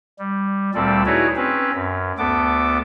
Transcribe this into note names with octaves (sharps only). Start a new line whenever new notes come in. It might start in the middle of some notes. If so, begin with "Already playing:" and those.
G3
D2 A#2 G3 C4 A4 D5
D#4 E4 F#4 G#4 B4 C#5
C4 C#4 B4
F#2
D2 B3 A4 D6